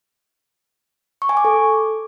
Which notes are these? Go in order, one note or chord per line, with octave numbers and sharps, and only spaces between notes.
C#6
G#5
D6
A4